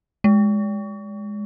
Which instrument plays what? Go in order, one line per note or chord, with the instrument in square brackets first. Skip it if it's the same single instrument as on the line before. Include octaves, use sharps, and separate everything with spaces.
[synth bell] G#3